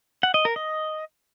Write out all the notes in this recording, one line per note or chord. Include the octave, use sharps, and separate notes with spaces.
F#5
D#5
A#4
D#5